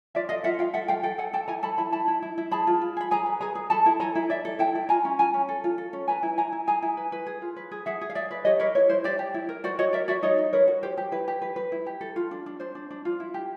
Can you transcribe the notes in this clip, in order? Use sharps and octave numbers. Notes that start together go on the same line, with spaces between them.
F4 D5 E5
A4 D#5 F5
F4 E5 F#5
F4 F5 G5
A4 E5 F#5
A4 F5 G5
A4 F5 G5
A4 F#5 G#5
A4 G5 A5
E4 G#5 A#5
A4 A5 B5
E4 A5 B5
E4 A5 B5
E4
E4
E4
G#4 A5 B5
F4
F4
G#4 B5
G#4 G#5 A#5
B4
G#4 G#5 A#5
G#4
A4 A5 B5
E4
A4 G#5 A#5
E4
E4 D5 E5
A4
E4 G5 A5
E4
F4 G#5 A#5
C#4
F4 G#5 A#5
C#4
A4
F4
A4
C#4
B4 G#5 A#5
E4
E4 G#5 A#5
E4
G#4 G#5 A#5
E4
B4
B4
G#4
F4
B4
G#4
G#4 E5 F#5
G#4
F5
G#4 D5 E5
B4
G4 C#5 D#5
A#4 B4 C#5
E4 B4 C#5
E4 C5
G4 C5 D5
G4
E4
A#4
F#4 C5 D5
F#4 C#5 D#5
A#4 D5 E5
F#4 D5 E5
D#4 C#5 D#5
D#4
A#4 B4 C#5
F#4
G4 C5
G4
E4 B4
G4
B4
B4
E4
G4
A4
F4
D4
D4
D4 C5
D4
D4
F4
E4
G4